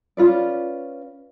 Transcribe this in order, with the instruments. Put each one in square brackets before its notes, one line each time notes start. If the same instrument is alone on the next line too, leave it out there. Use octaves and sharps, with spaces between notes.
[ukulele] C#4 F4 B4 D5